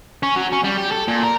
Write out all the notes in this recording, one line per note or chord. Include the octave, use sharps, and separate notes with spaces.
C#4
F#3
C#4
G3
G4
A4
A#2
A#4